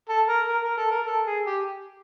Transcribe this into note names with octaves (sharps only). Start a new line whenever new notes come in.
A4
A#4
A#4
A#4
A4
A#4
A4
G#4
G4